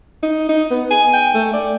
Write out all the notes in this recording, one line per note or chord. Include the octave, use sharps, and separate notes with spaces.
D#4
D#4
B3
G#5
G5
A3
D5